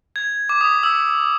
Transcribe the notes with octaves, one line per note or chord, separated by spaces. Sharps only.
G#6
D6
D#6
E6